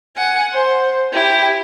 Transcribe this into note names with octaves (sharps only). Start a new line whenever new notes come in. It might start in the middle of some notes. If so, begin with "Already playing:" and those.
F#5 G#5
C5
E4 G4